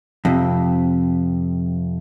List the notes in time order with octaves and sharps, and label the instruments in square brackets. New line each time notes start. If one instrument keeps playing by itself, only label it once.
[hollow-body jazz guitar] F2 C3